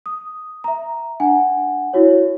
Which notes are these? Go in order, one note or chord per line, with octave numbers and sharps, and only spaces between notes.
D#6
E5 A#5
D4 F#5 G#5
E4 F#4 C#5